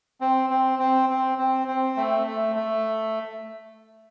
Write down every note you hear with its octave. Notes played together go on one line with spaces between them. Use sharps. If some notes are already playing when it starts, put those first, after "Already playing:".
C4
C4
C4
C4
C4
C4
A3
A3
A3